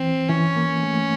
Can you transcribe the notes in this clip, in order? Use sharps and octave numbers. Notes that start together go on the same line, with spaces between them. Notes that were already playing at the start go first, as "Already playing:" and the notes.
Already playing: E3 C4
E3 C#4
A#3
A3